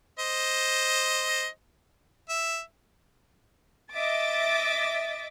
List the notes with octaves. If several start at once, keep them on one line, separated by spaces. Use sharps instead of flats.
C5 D#5
E5
D#5 E5 D6 A6